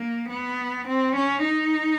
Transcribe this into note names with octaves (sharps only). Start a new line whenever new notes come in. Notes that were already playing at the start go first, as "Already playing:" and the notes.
Already playing: A#3
B3
C4
C#4
D#4